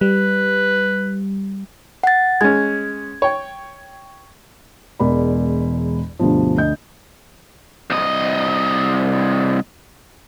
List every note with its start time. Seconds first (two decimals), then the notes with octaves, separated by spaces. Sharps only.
0.01 G3 B4
2.03 F#5 A6
2.41 G#3 C#4 G#6
3.22 C#5 G5
5.00 E1 E2 G#3 A#4 D5 B5
6.19 D2 G2 B2 F3
6.57 D2 D#5 G6
7.90 C2 D#5